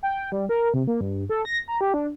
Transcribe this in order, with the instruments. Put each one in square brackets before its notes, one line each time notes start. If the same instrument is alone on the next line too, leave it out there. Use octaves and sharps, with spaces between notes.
[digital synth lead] G5
G3
A#4
C3
A#3
G2
A4
A#6
A#5
G4
D4